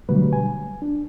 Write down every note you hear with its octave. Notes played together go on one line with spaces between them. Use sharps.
B2 D3 F#3 G3 A3 B4
G#5
D4